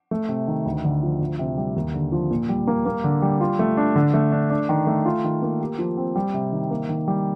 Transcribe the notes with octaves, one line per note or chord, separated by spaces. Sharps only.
A3
C3
D#3
D2
D3
F3
D2
C3
G3
D#2
D3
F3
A#2
G3
A#3
A#3
D3
G3
F4
A3
D4
D3
A3
D4
D4
D#3
A3
F4
D#3
A#3
G4
F3
C4
G3
C3
D#3
A#3
D#3
G3